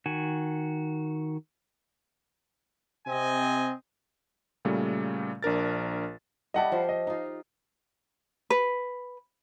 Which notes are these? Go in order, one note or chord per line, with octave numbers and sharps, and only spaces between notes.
D#3 F#4 G#5
C3 C4 D#5 G#5
A#2 C#3 G3 A3
A#1 D4 A#4 A6
G3 E4 G4 D#5 F#5 A5
F3 F4 C5
D#5
D#4 F4
B4